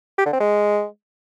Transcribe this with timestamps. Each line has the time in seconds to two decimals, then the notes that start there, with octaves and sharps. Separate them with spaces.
0.18 G4
0.26 D3
0.33 C4
0.40 G#3